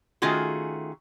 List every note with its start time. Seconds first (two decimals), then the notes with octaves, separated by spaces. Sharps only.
0.22 D#3 A3 C#4 F4 F#4 G#4